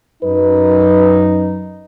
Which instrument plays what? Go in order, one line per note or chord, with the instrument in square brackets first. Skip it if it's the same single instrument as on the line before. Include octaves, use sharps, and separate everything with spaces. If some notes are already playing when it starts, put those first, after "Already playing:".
[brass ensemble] F#2 D#4 [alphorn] B4